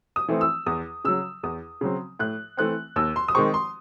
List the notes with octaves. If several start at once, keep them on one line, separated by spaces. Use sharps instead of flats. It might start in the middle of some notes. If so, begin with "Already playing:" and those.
D#6
E3 A3 C4
E6
E2 D#6
C#3 F#3 E6
E2 D#6
C#3 F#3 C4
A2 F#6
E3 A3 C4 F#6
D#2 E6
C6
D#6
D#3 G#3 C4 C#6
C6